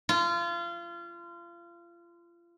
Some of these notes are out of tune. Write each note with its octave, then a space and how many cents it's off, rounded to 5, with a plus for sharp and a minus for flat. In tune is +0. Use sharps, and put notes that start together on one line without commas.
F4 -30